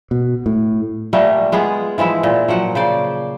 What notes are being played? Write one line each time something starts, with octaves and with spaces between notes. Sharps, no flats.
B2
A2
A#2 G3 A3 A#3
G#3 B3 F4 G#4
E3 F3 G#3 E4
A#2
F3 F#3 F#5
C#3 C5 D5